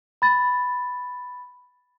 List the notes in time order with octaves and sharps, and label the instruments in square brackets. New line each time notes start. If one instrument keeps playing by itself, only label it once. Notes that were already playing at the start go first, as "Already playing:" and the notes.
[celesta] B5 A6